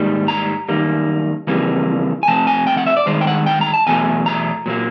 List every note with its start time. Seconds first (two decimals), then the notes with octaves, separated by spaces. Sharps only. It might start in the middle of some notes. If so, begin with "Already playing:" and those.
Already playing: G#2 D#3 G3 A#3
0.28 A#5
0.68 F#2 D#3 G3 A#3
1.47 F2 C#3 E3 G3 A#3
2.23 G#5
2.28 C3 F3 A3 A5
2.47 G#5
2.67 G5
2.77 F#5
2.86 E5
2.97 D5
3.06 G2 D#3 G#3 C5
3.21 G5
3.27 F#5
3.46 G5
3.61 A#5
3.74 A5
3.87 E2 B2 F#3 A3 G#5
4.26 A#5
4.66 A#2 F#3 A#3